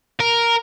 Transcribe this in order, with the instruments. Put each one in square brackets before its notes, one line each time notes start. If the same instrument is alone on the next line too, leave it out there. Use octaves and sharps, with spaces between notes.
[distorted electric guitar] A#4